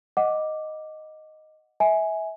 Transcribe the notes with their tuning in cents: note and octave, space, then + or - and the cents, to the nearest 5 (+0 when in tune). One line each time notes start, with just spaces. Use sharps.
D#5 +0 F#5 -5 D6 +0
E5 -25 G#5 +5